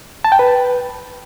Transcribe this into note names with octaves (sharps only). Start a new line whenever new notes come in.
A5
G5
B4